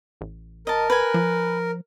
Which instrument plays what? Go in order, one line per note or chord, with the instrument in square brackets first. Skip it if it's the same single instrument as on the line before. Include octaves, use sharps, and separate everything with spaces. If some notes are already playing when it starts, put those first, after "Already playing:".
[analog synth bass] A1
[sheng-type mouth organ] A#4 [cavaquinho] D#5 A5
[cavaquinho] B4 G#5
[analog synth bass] F3